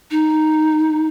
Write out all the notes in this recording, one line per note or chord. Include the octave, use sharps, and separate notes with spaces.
D#4